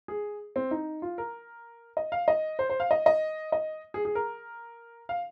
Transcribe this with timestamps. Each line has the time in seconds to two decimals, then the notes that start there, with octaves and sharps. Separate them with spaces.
0.08 G#4
0.56 C4
0.71 D#4
1.02 F4
1.18 A#4
1.97 D#5
2.12 F5
2.28 D#5
2.59 C5
2.70 C5
2.80 F5
2.91 D#5
3.06 D#5
3.52 D#5
3.94 G#4
4.05 G#4
4.15 A#4
5.09 F5